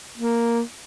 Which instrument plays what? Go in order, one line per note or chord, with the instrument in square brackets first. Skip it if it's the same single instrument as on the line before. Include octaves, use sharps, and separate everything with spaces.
[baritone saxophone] A#3